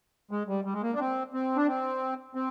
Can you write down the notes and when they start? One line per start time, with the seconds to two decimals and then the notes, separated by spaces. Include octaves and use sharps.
0.31 G#3
0.49 G3
0.65 G3
0.73 G#3
0.83 A#3
0.93 D4
1.00 C4
1.33 C4
1.56 D4
1.67 C4
2.35 C4